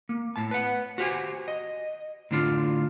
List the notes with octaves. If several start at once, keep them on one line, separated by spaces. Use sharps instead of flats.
A#3
A2 A5
B4 F#5
F#4 G4 C5 F#5 G#5
D#5
A2 D3 D4 F4